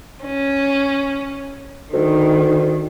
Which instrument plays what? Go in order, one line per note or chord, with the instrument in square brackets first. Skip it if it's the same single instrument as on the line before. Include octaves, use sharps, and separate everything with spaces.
[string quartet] C#4
[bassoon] D2 [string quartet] D#3